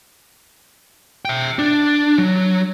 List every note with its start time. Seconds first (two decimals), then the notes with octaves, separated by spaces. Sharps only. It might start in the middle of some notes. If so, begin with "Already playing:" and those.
1.25 E5 G5
1.59 D4
2.18 F#3